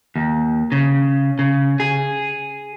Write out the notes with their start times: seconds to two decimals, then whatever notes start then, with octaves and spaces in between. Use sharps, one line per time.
0.16 D#2
0.72 C#3
1.39 C#3
1.80 G#4